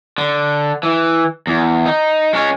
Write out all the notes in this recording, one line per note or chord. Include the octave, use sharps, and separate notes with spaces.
D3
E3
E2
D#4
G#3 C#4